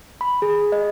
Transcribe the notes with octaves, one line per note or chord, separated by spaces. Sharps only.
B5
G#4
D#5